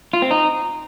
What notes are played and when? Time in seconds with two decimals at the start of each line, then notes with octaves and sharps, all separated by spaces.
0.13 F4
0.22 C4
0.31 D#4